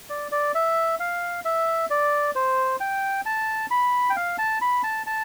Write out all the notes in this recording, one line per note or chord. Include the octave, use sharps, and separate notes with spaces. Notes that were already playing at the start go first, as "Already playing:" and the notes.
D5
D5
E5
F5
E5
D5
C5
G5
A5
B5
G5
F5
A5
B5
A5
A5